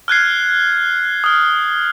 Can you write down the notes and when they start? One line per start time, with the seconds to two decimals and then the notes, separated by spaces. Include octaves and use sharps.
0.08 F6 F#6 G#6 C7
1.24 D#6 F6